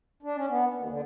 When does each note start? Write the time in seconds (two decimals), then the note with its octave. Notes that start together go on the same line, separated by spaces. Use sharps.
0.23 D4
0.37 C#4
0.49 B3
0.74 D#2
0.88 D3